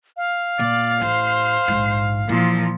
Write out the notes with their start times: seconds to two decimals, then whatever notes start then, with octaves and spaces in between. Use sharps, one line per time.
0.17 F5
0.59 A#2 D5
1.01 A1 C5
1.68 A#1 G#2
2.29 A#2 E3 F3